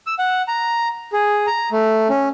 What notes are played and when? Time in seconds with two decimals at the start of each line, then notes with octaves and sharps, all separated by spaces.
0.07 E6
0.19 F#5
0.48 A#5
1.13 G#4
1.47 A#5
1.72 A3
2.09 C#4